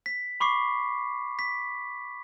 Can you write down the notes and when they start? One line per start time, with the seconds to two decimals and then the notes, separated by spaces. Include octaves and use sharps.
0.06 B6
0.40 B5 C#6 D6 C7
1.39 B6